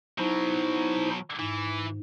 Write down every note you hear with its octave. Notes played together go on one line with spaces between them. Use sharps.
B2 F#3 D#4 E4 C5
G#2 E3